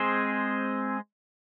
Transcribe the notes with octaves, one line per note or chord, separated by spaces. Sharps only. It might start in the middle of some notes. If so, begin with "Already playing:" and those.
Already playing: G#3 C4 G#4 C5